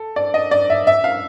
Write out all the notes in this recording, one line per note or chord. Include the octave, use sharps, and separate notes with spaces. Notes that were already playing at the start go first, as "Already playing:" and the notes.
Already playing: A4
D5
D#5
D5
E5
E5
F5